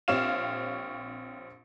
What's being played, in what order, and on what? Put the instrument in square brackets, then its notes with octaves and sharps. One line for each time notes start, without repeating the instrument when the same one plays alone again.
[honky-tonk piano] A#1 C4 G4 C#5 F5 E7